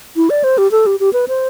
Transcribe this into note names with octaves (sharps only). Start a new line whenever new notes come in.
E4
D5
C5
G4
A4
G4
G4
B4
C5